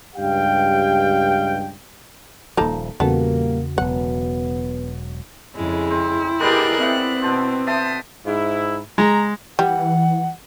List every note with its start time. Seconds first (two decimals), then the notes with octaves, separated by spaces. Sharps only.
0.16 C#2 G2 G4 F5 G5
2.57 D#1 F3 A#3 D#4 A4
3.00 E2 A#2 C#3 G3 A#3 B3 F#4 A4
3.78 E1 F#3 B3 F#5
5.55 F2 C#3 G#3 E4
5.91 C4
6.40 B3 D#4 G4 G#4 A#4 D5 F#6
6.80 C4 E5 F#5 G5
7.22 B2 A4 C5
7.67 E5 G5 A5 C6 D#6
8.26 G#2 E4
8.98 G#3 A#5
9.59 E3 G3 F#5